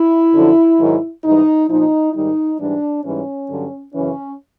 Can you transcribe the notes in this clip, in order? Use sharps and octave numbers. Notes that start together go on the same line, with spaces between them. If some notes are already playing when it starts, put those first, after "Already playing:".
Already playing: E4
F#2 D3 F3
G#2 D#3 F#3
G#2 E3 G3 D#4
A#2 F3 D#4
G#2 D#3 G3 D#4
G#2 E3 G3 D4
G#2 E3 G3 C#4
G2 D3 F#3
F#2 C#3 E3 C#4